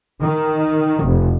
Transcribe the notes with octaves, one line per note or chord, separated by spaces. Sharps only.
D#3
F1